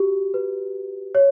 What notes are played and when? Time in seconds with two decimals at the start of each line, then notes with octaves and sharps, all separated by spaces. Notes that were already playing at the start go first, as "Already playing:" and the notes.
Already playing: F#4 G4
0.34 B4
1.15 C#5